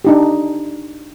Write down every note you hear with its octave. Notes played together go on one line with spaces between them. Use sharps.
D4 D#4 G4